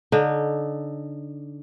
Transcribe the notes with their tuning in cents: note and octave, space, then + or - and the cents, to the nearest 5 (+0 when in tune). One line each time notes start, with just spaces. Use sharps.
D3 -25 D#4 -30